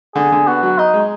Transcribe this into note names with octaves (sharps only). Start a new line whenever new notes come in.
D3 G#4
D3
B3 F#4
F#3
D#4 D#5
G#3